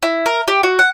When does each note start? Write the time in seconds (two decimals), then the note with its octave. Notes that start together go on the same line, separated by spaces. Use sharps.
0.03 E4
0.26 A#4
0.48 G4
0.63 F#4
0.79 F#5